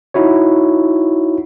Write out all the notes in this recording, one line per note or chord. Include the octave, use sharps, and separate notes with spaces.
D#4 E4 F#4 C#5